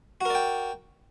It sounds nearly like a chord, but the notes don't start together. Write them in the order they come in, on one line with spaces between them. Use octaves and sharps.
F#4 A#4 D5 G5